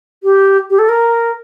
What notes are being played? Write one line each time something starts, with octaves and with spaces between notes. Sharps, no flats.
G4
G4
A4
A#4